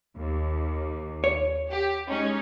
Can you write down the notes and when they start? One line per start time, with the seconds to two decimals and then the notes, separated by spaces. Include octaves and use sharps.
0.16 D#2
1.24 C#5
1.69 G4
2.08 G#3 C#4 D#4